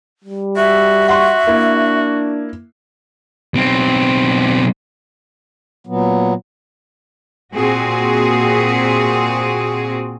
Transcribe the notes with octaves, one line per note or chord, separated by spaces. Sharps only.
G3
F#4 E5
F#4 F#5 C6 C#6
A#3 D4 E4
B1 C4
A#2 F#3 B3
A#2 C4 F#4 G#4